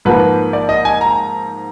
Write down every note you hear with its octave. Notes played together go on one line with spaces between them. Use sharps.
G#2 F3 A#3 B4
D5
D#5
G#5
A#5